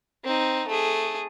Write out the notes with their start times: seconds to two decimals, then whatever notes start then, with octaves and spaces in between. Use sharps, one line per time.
0.24 C4 D#4
0.67 A3 G#4